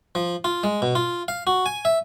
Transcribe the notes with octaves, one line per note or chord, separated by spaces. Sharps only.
F3
F4
G#3
B2
F4
F5
F#4
G#5
E5